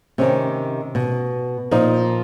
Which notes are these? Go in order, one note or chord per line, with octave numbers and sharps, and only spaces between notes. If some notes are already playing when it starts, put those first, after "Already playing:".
C3 D#3 C#4
B2
A#2 F3 D#4